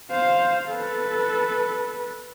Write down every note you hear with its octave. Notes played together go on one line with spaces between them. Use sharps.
C5 F5
A4 B4